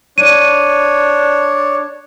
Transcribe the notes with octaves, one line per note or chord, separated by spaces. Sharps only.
D4 C#5 D#7